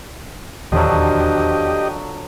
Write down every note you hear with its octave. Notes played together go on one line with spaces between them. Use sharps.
D#1 E2 D3 D#3 F3 F#3 G4 D#5